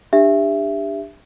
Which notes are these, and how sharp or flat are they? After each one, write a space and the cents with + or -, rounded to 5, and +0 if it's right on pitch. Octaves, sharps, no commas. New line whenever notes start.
D4 +15 G4 +30 E5 +15